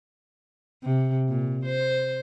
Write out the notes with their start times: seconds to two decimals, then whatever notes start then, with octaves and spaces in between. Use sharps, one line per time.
0.83 C3
1.29 A#2
1.65 C5